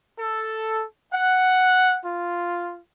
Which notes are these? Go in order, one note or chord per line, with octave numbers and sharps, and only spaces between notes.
A4
F#5
F4